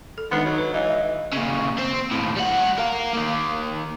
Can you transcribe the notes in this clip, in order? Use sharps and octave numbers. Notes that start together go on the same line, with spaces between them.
A4
D#3 G#3 B3 D4 D#4
F#3
B4
E3 D#5 F5
E5
A#2 C#3
C4 C5
D#2 A2
G3 F#5
A#4 F5
A#3 D#4